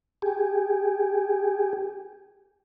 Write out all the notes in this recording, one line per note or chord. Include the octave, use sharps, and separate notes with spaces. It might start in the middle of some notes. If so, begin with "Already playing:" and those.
G4 G#4